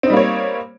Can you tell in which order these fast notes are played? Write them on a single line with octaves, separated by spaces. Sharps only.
C4 D#4 G3 A#3 C#5